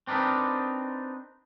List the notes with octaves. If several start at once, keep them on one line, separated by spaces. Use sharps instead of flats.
C4 D4 D#4 A#4 B4